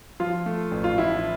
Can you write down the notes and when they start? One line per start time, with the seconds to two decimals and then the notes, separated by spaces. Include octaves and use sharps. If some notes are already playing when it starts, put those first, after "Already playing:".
0.20 F3 F4
0.46 A3
0.72 A1
0.84 F4
0.98 A2 E4